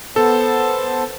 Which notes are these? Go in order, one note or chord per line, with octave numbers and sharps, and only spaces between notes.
B3 A4 C5 A5